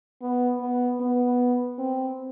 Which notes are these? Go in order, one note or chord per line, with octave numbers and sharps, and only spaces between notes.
B3
B3
B3
C4